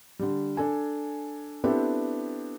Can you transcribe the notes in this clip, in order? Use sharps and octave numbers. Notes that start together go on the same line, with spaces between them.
D3 G3
D4 A4 G#5
B3 C4 D4 E4 G4 A4